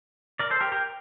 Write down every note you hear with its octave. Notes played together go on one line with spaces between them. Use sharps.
A#4 D5
A4 C5
G4 A#4
G4 A#4